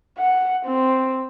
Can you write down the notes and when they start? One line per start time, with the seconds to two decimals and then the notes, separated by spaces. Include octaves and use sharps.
0.18 F#5
0.66 C4